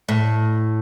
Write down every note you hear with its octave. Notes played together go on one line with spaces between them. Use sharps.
A2